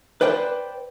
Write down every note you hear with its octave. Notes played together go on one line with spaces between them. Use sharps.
B4 C5 D5 G5